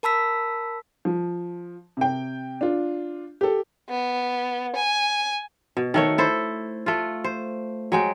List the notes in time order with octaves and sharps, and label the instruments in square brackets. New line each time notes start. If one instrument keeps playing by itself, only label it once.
[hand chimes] A#4 A5 B5 E6 B6
[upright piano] F3
C3 G5
D4 F4
G4 A4
[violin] B3
G#5
[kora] B2
D#3 A3 C#5
E4 A4 C5
A3 F4
C5
F#3 G#3 G5